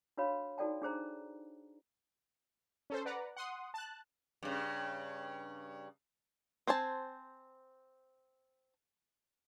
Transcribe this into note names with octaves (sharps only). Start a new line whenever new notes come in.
D4 F#4 B4 C#5 F5 B5
D#4 F#4 A4 D5 G5 A5
D4 G#4 C5 A#5
C#4 A4 C5
B4 D5 F#5 A#5
F#5 C6 D#6
A5 F#6
G2 C#3
C4 C5 G#5 A5